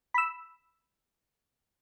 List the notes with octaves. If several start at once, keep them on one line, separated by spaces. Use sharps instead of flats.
B5 E6